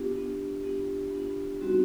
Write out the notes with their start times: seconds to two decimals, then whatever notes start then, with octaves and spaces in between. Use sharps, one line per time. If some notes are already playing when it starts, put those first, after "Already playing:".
Already playing: B3 D4 F4 G4
0.11 B3 D4 F4
0.61 B3 D4 F4 G4
1.11 B3 D4 F4
1.61 G3 C4 D#4 F#4